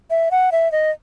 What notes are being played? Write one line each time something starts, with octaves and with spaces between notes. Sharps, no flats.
E5
F#5
E5
D#5